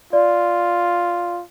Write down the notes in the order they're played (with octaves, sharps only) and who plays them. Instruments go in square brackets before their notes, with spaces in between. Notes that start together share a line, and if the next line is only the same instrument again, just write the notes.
[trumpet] F4 [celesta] D5